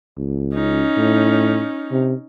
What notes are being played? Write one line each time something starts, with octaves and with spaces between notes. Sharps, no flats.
C#2
C#4 D#4
A2
C3